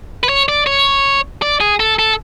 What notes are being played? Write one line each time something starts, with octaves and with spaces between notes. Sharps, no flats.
B4
C#5
D5
C#5
D5
G#4
A4
A4